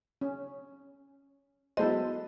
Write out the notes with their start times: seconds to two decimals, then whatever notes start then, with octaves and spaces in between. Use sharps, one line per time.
0.21 C#4
1.77 F#3 G#3 B3 E4 A4 C5 D#5